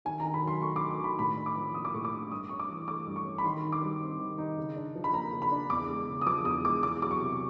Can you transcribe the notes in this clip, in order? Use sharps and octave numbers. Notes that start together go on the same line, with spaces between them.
D#3 G#5
A#5
D#3
B5
F#3 C6
A3 C#6
D6
D#3
C6
D#3 B5
A2 B5
D4
D6
F3
A#3 D#6
D6
A2 C#6
D6
D4
G2 D#6
C#4 C#6
D6
E3
A3 D6
G2
C#6
C#4
B5
D#3 C6
D#4
D6
G3
C4
D#3
D#4
C#3
D4
F3
B5
A#3 A#5
C#3
B5
D4
E2 D6
G#3
C#3
D#6
F3 D6
E2 D#6
G#3 D6
E2 D6
F#3 D6
C#6
C3